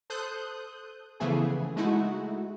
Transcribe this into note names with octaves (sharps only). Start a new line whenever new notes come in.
A4 C5 D#6 F#6 G6
C#3 E3 F3 A3 B3 G#4
G#3 A3 D#4 E4 F#4